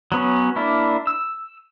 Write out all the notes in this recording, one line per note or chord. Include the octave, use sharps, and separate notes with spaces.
F#3 B3 C#4
A#3 D4 E4
E6